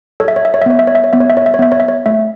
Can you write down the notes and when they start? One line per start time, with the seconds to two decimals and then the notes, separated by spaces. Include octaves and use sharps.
0.20 A4 C#5
0.28 E5
0.36 C#5
0.45 E5
0.54 C#5
0.62 E5
0.66 B3 C#5
0.79 E5
0.87 C#5
0.95 E5
1.04 C#5
1.13 B3 E5
1.20 C#5
1.30 E5
1.37 C#5
1.46 E5
1.54 C#5
1.59 B3 E5
1.72 C#5
1.80 E5
1.88 C#5
2.06 A3 E5